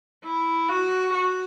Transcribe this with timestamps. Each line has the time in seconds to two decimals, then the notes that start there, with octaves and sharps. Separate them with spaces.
0.24 E4
0.69 F#4
1.13 F#4